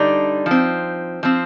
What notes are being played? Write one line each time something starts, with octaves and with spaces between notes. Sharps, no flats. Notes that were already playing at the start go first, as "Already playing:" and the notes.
Already playing: D3 G3 D4 D#4
F3 C4
F3 C4